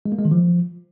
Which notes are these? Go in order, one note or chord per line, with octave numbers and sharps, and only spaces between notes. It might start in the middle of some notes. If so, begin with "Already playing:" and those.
G#3
A#3
G#3
D#3
F3